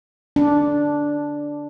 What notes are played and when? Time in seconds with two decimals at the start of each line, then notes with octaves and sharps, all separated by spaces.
0.36 D4